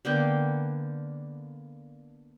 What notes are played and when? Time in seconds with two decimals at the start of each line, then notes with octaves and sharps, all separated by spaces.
0.05 D3 A#3 B3 G5